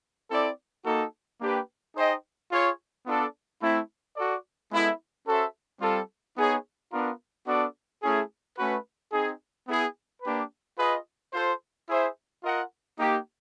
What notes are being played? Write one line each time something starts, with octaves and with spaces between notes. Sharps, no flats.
C4 E4 A4 D5
A#3 D#4 F#4 A4
A#3 D4 G4 B4
D#4 G#4 C5 D#5 G5
F4 G#4 C#5
B3 D4 F4 A4 D5
A3 C4 E4
F#4 A4 D5
G#3 B3 E4 A4
C#4 F#4 A4 C5 E5
G3 C4 F4 A4
B3 D#4 G#4 C#5
B3 D4 F4 A#4
B3 D4 F#4 A4 D5
A3 C#4 E4 G#4
A3 C#4 F#4 B4
C4 D#4 G#4
B3 E4 G#4
A#3 D4 G4 B4
F4 G#4 B4 D#5
F4 A4 C5
E4 G#4 C5 E5
F4 A#4 D#5 F#5
A#3 D#4 G4